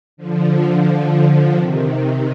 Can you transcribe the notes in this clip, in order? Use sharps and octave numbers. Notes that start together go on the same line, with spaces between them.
D3 F3
C3 D#3